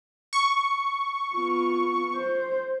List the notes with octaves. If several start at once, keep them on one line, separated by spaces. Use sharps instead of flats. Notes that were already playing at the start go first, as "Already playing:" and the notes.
C#6
B3 F4
C5